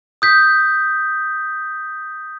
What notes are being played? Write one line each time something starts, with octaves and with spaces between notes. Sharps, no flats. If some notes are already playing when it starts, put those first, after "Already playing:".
D#6 G6 B6